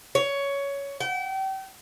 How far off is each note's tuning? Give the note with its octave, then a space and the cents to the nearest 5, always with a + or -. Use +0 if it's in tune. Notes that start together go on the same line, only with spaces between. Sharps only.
C#5 +15
G5 -35